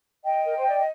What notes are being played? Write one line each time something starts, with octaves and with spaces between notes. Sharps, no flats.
D#5 G5
A#4
C5
D5
D#5